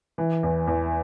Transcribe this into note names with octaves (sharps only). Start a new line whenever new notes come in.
E3
E2
E2